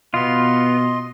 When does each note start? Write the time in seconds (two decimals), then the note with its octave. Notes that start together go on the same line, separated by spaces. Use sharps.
0.14 B2 B3 F4 D#5 C6